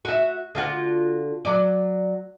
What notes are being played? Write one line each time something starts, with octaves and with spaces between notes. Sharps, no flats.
F#4 E5
D3 F4 F#4
F#3 D5